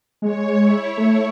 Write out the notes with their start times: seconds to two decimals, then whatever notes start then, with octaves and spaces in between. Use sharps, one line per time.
0.21 G#3 C#5
0.59 E4
0.97 A3 E4